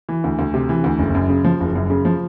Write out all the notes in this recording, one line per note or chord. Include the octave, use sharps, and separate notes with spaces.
E3
D2
D2
C3
E3
D2
F#1
F#2
C#3
F3
F#1
F#2
C#3
F3